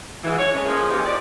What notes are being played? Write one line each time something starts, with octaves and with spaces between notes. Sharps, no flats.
G#2 E3
C#5
E3 G#3 A3 C#4
C#3 F3 A#3 G#4
D#2 C3 E3 G4 D#5
F3 D4 D5